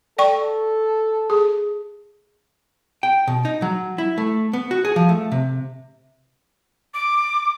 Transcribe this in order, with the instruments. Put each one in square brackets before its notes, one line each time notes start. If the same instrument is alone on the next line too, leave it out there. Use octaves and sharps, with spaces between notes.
[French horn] A4 [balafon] D5 G5 C#6
[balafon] G#4
[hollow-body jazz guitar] G5
B2
D#4
F#3
E4
A3
B3
F#4
G#4
F3
A3
C3
[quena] D6